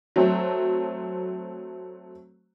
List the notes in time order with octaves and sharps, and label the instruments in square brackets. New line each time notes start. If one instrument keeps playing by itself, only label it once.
[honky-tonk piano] F#3 A3 C4